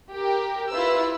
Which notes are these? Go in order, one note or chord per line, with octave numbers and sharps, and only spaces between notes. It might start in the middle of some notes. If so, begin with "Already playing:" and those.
G4 A#4
E4 F4 B4 E6